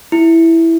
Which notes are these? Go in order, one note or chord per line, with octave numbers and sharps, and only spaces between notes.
E4